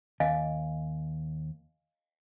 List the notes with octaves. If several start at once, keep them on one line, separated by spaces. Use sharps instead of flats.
D#2 D#5 F5 G#5